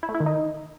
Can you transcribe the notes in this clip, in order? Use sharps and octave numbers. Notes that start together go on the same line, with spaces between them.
E4
A3
E4
D#3
D#4